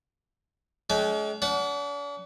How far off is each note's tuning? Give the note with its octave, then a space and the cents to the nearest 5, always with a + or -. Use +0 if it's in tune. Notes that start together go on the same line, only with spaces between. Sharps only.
G#3 +40 C#4 +45 G5 +0
D4 -45 F#5 +15